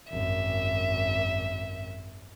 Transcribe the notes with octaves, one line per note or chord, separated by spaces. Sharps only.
G#1 F#2 E5